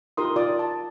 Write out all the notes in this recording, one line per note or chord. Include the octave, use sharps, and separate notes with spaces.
D#4 F4 G4 A#4 C6 D#6
F4 D5 D6 D#6
A5